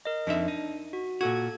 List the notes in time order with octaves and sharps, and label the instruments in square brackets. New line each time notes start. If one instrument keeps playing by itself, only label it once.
[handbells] A#4 D#5
[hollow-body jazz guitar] F2 D#4 E5 [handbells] D4
[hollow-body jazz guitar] D#4
[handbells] F#4
[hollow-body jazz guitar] A#2 F#4 [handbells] A4 G#6